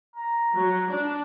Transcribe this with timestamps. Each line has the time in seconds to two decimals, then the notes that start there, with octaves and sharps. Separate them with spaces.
0.16 A#5
0.54 F#3
0.89 D4